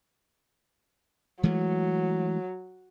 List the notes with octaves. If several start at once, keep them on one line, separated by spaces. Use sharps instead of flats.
E3 F#3 G#3 A3